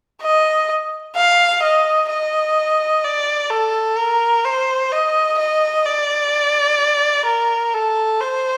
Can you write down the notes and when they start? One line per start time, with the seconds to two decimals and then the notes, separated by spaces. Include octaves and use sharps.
0.22 D#5
1.15 F5
1.63 D#5
2.09 D#5
3.04 D5
3.50 A4
3.98 A#4
4.45 C5
4.92 D#5
5.38 D#5
5.85 D5
7.26 A#4
7.74 A4
8.20 C5